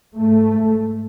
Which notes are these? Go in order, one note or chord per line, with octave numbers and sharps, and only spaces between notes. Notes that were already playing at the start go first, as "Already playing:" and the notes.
G#2 A3